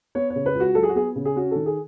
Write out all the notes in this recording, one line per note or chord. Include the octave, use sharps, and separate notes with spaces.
B3 C#5
C#5
C#3
B4
C#2
F#4
F#3 A4
G#4
F#4
B3 G#4
C#3
G#4
C#4 F#4
D#3 A4
G#4